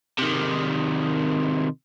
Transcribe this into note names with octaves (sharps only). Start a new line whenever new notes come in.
C3 D#3